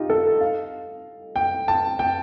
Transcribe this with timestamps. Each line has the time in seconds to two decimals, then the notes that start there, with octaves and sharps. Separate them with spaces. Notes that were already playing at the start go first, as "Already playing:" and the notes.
Already playing: D#4 F4 G4
0.10 A4
0.41 F5
1.36 G5
1.68 A5
1.99 G5